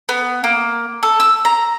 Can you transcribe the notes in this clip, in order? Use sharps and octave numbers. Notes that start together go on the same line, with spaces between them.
B3
A#3
A4
E6
A#5